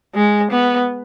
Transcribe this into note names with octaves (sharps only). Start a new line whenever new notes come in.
G#3
B3